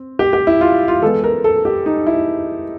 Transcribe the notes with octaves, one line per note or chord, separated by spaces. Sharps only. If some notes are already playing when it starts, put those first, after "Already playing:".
Already playing: C4
G4
G4
E4
F4
F4
E3 G#3 B3 A4
A#4
A4
G4
D#4
E4